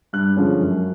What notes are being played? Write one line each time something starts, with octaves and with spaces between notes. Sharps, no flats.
G2 F#6
D3 F3 G#3 C#4
F#2